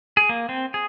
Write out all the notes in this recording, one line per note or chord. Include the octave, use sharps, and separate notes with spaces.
G#4
A#3
C4
G#4